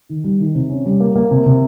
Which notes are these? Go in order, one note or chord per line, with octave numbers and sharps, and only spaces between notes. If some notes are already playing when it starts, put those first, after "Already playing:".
D#3
G3
D#3
C3
C#4
G3
A#3
A#3
C3
C3